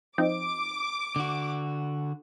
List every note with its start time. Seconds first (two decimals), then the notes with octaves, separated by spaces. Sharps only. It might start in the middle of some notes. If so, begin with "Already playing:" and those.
0.18 F3 C4 D#4 D6
1.16 D3 F#4